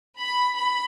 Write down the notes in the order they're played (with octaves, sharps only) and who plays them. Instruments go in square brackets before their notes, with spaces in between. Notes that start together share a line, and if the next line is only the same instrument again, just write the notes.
[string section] B5
B5